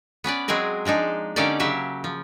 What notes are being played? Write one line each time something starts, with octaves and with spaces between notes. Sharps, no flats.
B3 C#4 B4 D5
F#3 G#3 C4 G#4 A#4
F3 G#3 D4 D#4
D3 A#3 C#4 D#4 G4 D5
C#3 F#3 G4 E5 F5
F3